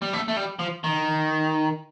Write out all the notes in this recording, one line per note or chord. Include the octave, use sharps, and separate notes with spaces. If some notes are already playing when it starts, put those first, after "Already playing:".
G3
A3
A3
G3
F3
D#3